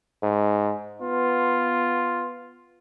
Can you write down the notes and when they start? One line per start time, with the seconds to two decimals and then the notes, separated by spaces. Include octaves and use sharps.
0.23 G#2
1.02 B3 F4